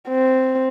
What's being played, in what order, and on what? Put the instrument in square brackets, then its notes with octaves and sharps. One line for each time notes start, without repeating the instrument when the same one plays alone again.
[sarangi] C4